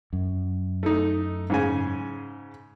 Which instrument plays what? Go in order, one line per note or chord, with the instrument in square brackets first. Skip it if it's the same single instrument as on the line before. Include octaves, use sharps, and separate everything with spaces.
[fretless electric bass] F#2
[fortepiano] A3 D#4
G#2 C#3 G#5